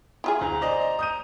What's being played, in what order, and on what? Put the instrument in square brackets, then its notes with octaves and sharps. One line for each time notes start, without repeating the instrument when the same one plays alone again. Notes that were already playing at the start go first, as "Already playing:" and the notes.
[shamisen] E4 F4 G#4
[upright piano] D2 [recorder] A#5
[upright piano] C5 D5 D#5
D#6 G6 D#7